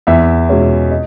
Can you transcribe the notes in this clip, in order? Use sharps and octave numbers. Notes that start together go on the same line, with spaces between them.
E2 E5
B2 G#3 C#4
D#5